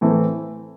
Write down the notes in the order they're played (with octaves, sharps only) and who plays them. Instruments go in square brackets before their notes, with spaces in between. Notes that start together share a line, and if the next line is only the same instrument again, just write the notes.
[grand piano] A2 E3 A3 C4